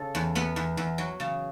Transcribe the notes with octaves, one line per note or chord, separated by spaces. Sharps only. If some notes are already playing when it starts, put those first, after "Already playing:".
Already playing: C#3 A4
E2
E2 B3
E2
E2
F#3
C#3